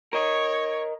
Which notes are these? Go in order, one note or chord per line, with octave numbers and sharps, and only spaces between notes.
A#4 C#5 D#5